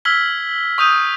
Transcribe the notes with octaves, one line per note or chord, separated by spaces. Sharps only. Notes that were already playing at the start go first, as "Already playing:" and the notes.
E6 F6 G#6 B6 G7
C#6 D#6 G6 D#7